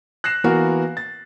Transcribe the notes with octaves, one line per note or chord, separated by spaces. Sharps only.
F#6 A#6 C7 E7
E3 A#3 B3 F#4 A#4
A6